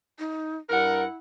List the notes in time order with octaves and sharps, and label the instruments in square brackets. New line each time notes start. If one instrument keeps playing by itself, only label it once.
[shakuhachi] D#4
[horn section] G2 A#4 [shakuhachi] E4 [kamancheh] F#5